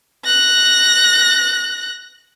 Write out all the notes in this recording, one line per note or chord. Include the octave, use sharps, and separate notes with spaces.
F#6 A#6